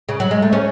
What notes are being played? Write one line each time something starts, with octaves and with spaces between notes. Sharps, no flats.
C#3
F#3
G#3
A3
C#4